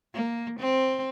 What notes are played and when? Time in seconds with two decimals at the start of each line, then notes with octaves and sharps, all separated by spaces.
0.14 A#3
0.60 C4